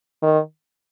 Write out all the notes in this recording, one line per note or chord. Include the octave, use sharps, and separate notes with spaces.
D#3